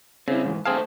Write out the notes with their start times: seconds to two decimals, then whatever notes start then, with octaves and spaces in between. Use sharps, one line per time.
0.28 C#3 C4 E4
0.44 G#2 D#3 E3
0.65 A3 C4 G#4 C5 F5 A5